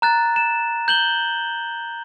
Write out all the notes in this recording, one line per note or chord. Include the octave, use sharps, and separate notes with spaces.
A#5 F#6 A6
E7
G6 F#7 G7